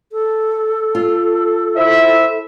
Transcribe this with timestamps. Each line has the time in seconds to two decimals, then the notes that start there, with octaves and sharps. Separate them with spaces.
0.12 A4
0.95 F4
1.77 E4 C5 E5